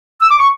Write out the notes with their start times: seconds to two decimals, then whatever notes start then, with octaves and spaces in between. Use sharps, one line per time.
0.21 E6
0.31 D6
0.40 C#6